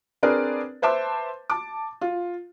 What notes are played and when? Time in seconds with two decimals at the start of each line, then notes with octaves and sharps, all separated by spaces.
0.23 C4 D4 G#4 A#4 B4 D5
0.82 B4 C5 E5 A5 D6
1.50 A5 D6
2.01 F4